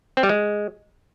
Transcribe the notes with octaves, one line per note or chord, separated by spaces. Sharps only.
C4
G3
G#3